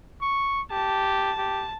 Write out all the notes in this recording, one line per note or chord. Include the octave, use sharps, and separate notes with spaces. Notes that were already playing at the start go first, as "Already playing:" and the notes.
C#6
G4 A5
G4